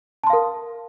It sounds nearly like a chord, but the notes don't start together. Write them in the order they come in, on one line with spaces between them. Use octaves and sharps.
A5 C6 F5 A#4